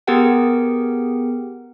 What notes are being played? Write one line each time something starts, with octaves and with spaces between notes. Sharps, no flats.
B3 G4 G#4 A#4 F#5 G5